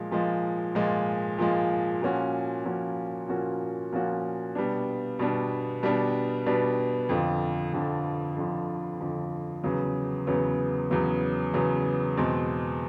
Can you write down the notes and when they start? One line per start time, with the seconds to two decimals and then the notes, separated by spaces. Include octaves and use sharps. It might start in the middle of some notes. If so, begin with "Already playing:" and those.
Already playing: A#2 F3 G#3
0.11 A#2 F3 G#3
0.75 A#2 F3 G#3
1.38 A#2 F3 G#3
2.02 A#2 F3 A#3 C#4 F#4
2.65 A#2 F3 A#3 C#4 F#4
3.28 A#2 F3 A#3 C#4 F#4
3.92 A#2 F3 A#3 C#4 F#4
4.55 B2 G3 B3 D4
5.19 B2 G3 B3 D4
5.83 B2 G3 B3 D4
6.46 B2 G3 B3 D4
7.09 F2 D3 F3
7.73 F2 D3 F3
8.37 F2 D3 F3
9.01 F2 D3 F3
9.63 E2 C#3 F#3 B3
10.27 E2 C#3 F#3 B3
10.90 E2 C#3 F#3 B3
11.54 E2 C#3 F#3 B3
12.17 E2 B2 G#3 C4